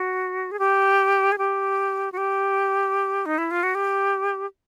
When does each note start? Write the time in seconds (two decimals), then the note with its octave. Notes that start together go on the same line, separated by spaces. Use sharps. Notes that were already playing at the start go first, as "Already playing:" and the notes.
Already playing: F#4
0.51 G#4
0.59 G4
1.32 G#4
1.38 G4
2.12 F#4
2.17 G4
3.26 D#4
3.38 E4
3.51 F4
3.63 F#4
3.75 G4